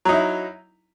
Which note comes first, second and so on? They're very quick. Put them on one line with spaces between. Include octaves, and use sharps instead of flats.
F#3 D#4 E4